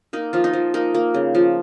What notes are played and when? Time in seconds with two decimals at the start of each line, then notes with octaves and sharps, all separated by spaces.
0.13 A#3 D#4
0.33 F3 F4
0.44 D#4
0.53 F3
0.74 A#3 D#4
0.95 A#3
1.14 C#3
1.35 F3